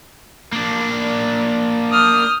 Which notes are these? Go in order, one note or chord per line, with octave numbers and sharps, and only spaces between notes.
A#3 D4
D#6 F6 G6